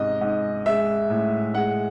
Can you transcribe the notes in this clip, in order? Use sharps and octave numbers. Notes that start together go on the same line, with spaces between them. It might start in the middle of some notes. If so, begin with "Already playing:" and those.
Already playing: G#2 C3 D#5
G#2
G#3 E5
A2
G#3 F#5